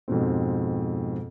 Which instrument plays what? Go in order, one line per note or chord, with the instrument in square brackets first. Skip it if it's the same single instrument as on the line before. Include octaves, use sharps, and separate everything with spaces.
[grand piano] F2 G#2 B2 C4